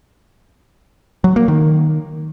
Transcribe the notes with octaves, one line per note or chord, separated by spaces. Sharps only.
F#3
A#3
D#3